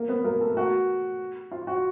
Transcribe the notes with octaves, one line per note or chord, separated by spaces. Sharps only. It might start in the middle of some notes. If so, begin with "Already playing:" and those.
Already playing: A#3 A#4
B3 B4
A#3 A#4
A3 A4
F#4
F4
F#4